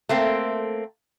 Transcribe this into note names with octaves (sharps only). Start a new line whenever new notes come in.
A3 A#3 C4